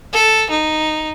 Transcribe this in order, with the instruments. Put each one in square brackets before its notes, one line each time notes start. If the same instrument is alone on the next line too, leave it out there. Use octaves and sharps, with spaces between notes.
[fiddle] A4
D#4